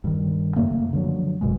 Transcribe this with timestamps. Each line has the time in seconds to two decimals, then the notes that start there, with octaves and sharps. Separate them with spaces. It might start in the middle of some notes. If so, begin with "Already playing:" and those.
0.04 G2 D#3
0.56 F#2 C#3 A3 A#3
0.93 D3 F3 F#3
1.41 F#1 F#2 B2 G#3